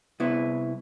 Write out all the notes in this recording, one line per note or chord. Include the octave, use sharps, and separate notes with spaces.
C2 B3 E4